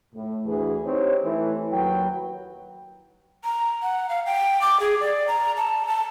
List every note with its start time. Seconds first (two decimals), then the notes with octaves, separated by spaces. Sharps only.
0.14 A2
0.46 D2 E3 G#4
0.85 C4 D#4 G4 C#5
1.25 E3 A3
1.72 D#2 F#3 B4 G5
3.44 A#5
3.83 F#5
4.09 F5
4.26 G5
4.61 D6
4.80 G#4
5.01 D5
5.27 A#5
5.57 A5
5.87 A5